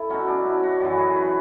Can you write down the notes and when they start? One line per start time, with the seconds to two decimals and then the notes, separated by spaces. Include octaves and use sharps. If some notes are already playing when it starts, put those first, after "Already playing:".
Already playing: E4 A4
0.09 B2 F#3 C#4
0.28 D4
0.46 E4
0.63 F#4
0.80 F#2 E3 F#4
0.98 G#4
1.16 B4